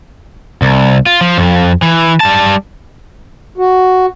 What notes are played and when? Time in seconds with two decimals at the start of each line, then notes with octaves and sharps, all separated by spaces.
0.62 C2
1.06 F4
1.21 F3
1.38 F2
1.82 E3
2.20 G3 A5
3.58 F#4